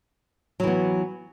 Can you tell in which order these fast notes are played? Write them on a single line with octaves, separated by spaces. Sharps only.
F#3 E3 B3